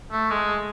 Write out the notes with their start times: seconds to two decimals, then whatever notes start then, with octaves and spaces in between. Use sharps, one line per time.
0.12 A3
0.31 G#3